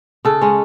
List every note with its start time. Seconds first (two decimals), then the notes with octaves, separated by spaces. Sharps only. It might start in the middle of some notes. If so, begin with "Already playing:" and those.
0.25 C#3 A4
0.41 G#3 C#4